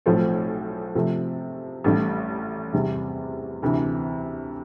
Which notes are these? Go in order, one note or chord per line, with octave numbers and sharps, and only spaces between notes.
B1 A2 F3 C4
C3 F3 A3
A1 A2 G3
E2 C3 G3
D2 C3 E3